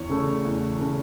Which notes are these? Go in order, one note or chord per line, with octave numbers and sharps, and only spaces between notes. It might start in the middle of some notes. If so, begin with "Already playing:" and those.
Already playing: E2 C#5 C#6
C#3 A3
E2
C#3 A3